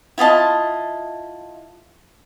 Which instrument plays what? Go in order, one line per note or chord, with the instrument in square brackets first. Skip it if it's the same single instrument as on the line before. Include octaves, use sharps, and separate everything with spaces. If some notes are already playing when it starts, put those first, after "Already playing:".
[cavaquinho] E4 F4 D#5 A5